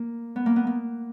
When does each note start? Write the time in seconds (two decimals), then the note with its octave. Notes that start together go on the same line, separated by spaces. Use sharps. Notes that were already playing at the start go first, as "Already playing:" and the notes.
Already playing: A#3
0.36 B3
0.46 A#3
0.56 B3
0.67 A#3